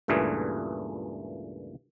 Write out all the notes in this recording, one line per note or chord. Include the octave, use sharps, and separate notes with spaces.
C#2 G2 A#2 E3 A3 G#4